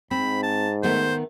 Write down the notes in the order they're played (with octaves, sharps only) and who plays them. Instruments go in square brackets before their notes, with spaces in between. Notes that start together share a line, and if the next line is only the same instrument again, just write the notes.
[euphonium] G#2 [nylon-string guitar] C4 [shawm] B5
[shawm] A5
[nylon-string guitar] D#3 A3 B3 [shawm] C5